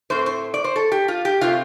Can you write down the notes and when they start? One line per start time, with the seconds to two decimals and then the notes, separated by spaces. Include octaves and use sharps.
0.10 A2 A3 C4 C5
0.26 C5
0.54 D5
0.64 C5
0.76 A4
0.92 G4
1.08 F4
1.25 G4
1.41 C3 A3 C4 F4